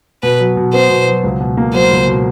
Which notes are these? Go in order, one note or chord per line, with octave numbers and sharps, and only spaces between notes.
B2 B4
F#3
B2
B3 C5
B2
F#3
C#2
B2
A#3
F#3 C5
C#2
B2